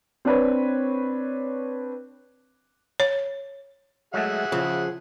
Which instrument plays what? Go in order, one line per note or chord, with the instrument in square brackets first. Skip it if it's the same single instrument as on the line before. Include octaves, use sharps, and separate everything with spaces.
[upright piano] C4 D4 B4 C#5
[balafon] C#5
[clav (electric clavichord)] F#3 G#3 A3 [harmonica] G#4 E5 F#5
[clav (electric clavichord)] C#3 [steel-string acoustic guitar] F3